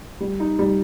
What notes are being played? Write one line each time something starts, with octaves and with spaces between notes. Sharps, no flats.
G3
D#4
G3